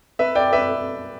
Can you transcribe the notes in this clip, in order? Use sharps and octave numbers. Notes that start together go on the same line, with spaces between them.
B4 E5
D5 G5
B4 E5